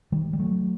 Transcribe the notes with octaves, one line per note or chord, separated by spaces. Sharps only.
D#3 G3
G3
F#3 A3